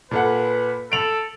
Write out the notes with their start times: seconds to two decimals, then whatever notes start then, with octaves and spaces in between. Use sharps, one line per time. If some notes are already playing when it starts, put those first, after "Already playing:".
0.11 A#2 A4 B4 F#5
0.92 A4 D7 F7 F#7